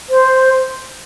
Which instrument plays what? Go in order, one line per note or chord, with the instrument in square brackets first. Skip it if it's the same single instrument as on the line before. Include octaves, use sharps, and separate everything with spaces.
[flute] C5